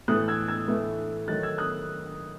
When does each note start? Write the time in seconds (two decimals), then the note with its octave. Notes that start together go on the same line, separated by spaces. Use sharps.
0.08 A2 E3 A3 D#6 F#6
0.28 E6 G#6
0.48 E6 G#6
0.68 A2 E3 A3
1.28 D#3 F#3 A3 F#6 A6
1.43 E6 G#6
1.58 D#6 F#6